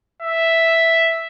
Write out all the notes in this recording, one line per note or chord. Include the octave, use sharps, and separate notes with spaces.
E5